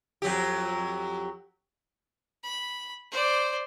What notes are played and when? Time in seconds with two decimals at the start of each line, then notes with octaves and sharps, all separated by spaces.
0.22 F2 F#3 G4
2.44 B5
3.11 C5 D5